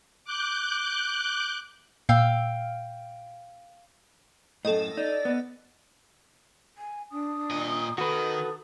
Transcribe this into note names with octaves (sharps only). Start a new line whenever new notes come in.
D6 F#6 G6
A#2 F5 G5 E6
F#2 A2 A4 D#5
D#4 D5
B3
G#5
D4 D#6
A#2 D#5
D#3 F#4 A4 B4 D#6